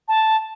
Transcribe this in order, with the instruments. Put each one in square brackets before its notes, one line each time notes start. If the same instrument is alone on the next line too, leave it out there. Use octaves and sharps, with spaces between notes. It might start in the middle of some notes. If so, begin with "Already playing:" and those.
[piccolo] A5